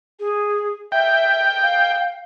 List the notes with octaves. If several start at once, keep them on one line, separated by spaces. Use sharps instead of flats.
G#4
E5 G5
F5